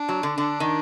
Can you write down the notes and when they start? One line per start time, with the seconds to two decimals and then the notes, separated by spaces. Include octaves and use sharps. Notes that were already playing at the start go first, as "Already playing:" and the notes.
Already playing: D4
0.09 F#3
0.23 D3
0.38 D3 D4
0.60 D#3